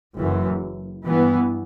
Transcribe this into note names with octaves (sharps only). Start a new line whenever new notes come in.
F#1 F#2 E3
G2 E3 B3